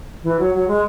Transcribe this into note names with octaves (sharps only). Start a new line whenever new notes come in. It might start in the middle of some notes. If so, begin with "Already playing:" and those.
E3
F#3
F#3
G#3